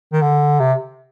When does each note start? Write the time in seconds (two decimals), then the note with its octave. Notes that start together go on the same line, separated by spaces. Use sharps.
0.13 D#3
0.22 D3
0.60 C3